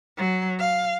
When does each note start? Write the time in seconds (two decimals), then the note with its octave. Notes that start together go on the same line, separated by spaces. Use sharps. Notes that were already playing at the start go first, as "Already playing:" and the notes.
0.17 F#3
0.60 F5